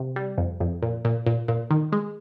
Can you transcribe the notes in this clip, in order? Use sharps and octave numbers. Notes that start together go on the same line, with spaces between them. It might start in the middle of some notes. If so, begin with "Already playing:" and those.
Already playing: C3
G3
F2
F2
A#2
A#2
A#2
A#2
D#3
G#3